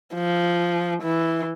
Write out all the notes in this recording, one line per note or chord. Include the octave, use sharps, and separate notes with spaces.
F3
E3